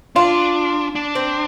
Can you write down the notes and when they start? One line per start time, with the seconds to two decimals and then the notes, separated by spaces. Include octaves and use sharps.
0.16 D4 F4
0.95 D4
1.15 C4